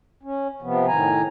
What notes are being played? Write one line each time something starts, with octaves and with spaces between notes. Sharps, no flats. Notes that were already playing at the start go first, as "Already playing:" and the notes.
C#4
C3 F3 B3
A2 D#3 G#5 A#5